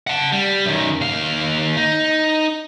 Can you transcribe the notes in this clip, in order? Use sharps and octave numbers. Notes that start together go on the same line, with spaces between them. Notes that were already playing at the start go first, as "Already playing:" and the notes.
F#5 A5
G3
F#2 D#3
D#2 F5
D#4